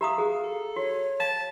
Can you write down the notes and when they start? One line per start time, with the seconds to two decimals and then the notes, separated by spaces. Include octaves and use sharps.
0.01 G4 E5 F5 A#5 D#6
0.18 F#4 G#4
0.43 A4
0.76 F#4 C#5
1.20 F5 A5